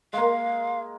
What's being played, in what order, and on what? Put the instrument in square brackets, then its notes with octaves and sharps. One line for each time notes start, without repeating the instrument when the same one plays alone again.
[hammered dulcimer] G#3 A#3 [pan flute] F5